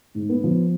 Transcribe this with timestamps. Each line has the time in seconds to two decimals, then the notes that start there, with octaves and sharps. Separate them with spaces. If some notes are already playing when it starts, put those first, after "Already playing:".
0.15 G#2
0.29 B3
0.44 F3